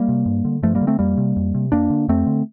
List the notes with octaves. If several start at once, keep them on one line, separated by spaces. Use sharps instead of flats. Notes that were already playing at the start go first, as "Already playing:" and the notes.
Already playing: G3 A#3
C3
G2
D3
G2 F3 A3
G3 A#3
D3
A3 C4
F2 G3 A#3
C3
F2
C3
F2 A#3 D4
D3
F2 A3 C4
D3